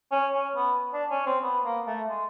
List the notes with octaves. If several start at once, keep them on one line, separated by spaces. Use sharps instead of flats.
C#4
C#4
B3
D4
C#4
C4
B3
A#3
A3
G#3